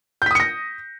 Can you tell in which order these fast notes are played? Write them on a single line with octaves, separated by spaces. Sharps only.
G6 B6 D#6 C#7 A#6